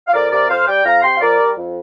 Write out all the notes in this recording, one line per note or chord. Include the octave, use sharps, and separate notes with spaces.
F5
F2 A#4 D5
C3 A#4 D5
F2 C5 F5
G3 D5 G5
F2 F5 A#5
C3 G5 C6
F5
F2 A#4 D5
G3
F2